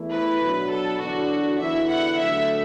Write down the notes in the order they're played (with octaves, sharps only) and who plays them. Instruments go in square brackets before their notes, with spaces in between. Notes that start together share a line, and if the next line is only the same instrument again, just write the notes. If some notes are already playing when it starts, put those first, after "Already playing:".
Already playing: [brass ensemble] E2 E3 A3 E4
[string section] B4
[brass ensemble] B2 F#3 D4
[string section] A4
[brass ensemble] E2 D3 F#3 D4 [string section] F#4
[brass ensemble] E2 D3 B3 E4 [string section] E5
[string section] F#5
[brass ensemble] D3 F#3 A3 [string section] E5